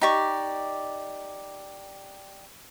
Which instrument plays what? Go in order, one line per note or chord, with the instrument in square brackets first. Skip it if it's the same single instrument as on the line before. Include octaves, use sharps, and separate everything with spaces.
[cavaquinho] D#4 G4 D5 C#6